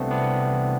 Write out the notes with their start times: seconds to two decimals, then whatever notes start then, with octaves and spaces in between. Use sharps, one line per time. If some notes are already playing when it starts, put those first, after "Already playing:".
Already playing: C2 C3 A3 B3 C4 D4
0.11 C2 B3 D4
0.31 C2
0.52 E3